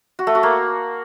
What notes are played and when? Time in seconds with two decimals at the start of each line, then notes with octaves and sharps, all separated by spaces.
0.19 F#4
0.27 A3
0.35 F#4
0.43 A#3